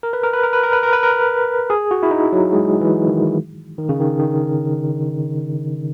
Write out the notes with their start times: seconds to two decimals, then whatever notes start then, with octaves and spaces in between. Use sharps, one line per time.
0.03 A#4
0.13 B4
0.23 A#4
0.33 B4
0.43 A#4
0.53 B4
0.63 A#4
0.73 B4
0.83 A#4
0.93 B4
1.03 A#4
1.70 G#4
1.91 F#4
2.03 E4
2.11 D#4
2.32 F#3
2.53 G#3
2.81 E3
3.08 D#3
3.78 D#3
3.89 C#3
4.00 D#3
4.19 D#3